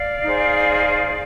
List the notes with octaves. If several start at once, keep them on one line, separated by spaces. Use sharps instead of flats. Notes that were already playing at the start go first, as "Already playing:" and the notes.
Already playing: D5 F5
D#4 G#4 C5